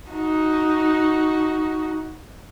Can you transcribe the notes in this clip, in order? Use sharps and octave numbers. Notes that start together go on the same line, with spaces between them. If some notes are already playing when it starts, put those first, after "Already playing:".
D#4 F#4